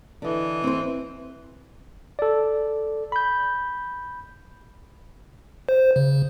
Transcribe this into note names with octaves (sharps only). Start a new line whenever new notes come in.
D3 E3 D#5
C4 C5
A4 D5
B5 G6
C5
C#3